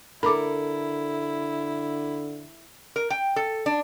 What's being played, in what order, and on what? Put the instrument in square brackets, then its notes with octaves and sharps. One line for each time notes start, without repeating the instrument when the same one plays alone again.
[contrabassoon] D3 [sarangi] E4 [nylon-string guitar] A4 A#4 [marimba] B5 D6
[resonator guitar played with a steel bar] A#4
G5
A4
D4